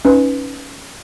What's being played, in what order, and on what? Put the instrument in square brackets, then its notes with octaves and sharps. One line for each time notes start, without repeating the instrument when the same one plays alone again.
[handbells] C#4 D#4 B4